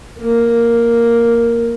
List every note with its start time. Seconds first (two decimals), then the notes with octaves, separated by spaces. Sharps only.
0.18 A#3